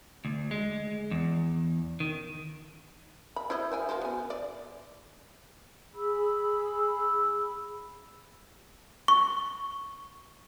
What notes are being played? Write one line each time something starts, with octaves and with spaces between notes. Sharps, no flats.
D2
G#3
E2
D#3
B5
E4 C5 D#5
C5 G5 G#5
F3 F#4 C5
B3 G#5
D5
G#4 B5 E6
C#6